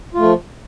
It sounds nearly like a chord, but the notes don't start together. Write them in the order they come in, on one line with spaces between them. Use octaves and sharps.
F4 A3 F3